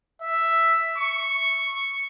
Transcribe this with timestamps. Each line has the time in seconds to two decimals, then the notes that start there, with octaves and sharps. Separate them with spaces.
0.22 E5
0.98 C#6